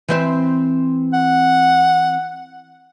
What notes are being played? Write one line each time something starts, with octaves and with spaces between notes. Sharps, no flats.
E3 C4 E5
F#5